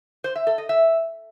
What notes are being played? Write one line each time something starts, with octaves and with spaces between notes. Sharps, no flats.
C5
E5
A4
D#5
E5